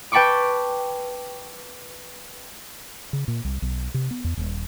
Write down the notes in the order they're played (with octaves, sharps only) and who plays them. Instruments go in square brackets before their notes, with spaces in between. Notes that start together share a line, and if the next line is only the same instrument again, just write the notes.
[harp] B4 G5 A5 B5 C#6 D6
[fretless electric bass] C#3
A#2
C2
B1
C3
B3
E2
D#1